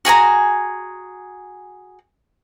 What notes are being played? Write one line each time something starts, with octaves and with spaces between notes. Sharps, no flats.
F#4 G#4 G#5 A#5